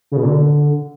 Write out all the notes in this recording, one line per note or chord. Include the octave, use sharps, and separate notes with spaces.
C#3
B2
A#2
D3